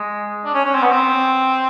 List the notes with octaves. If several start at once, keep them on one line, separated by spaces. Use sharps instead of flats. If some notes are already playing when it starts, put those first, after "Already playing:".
Already playing: G#3
D4
C#4
C#4
C4
B3
C4